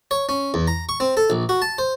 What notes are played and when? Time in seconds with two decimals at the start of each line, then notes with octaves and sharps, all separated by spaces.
0.11 C#5
0.29 C#4
0.54 E2
0.68 A#5
0.89 C#6
1.00 C4
1.17 A4
1.30 A#1
1.49 F#4
1.62 A5
1.78 C5